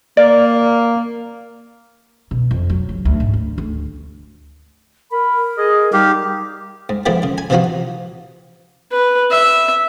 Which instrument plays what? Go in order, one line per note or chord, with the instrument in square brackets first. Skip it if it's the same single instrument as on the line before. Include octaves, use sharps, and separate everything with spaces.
[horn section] A#3 [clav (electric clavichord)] D5
[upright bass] B2
F2
F#3
C#3
D2
G#2
D2
D2
[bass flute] A#4 [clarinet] B5
[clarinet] G#4 [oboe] D#5
[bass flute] G3 [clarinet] D#4 [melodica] G4 [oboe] F5
[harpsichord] G#2
G#2 D#3 F3 G#3 A3 B3
C#3
G#5
C3 E3 F3 D#4 F4 F#4
[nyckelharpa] B4
E5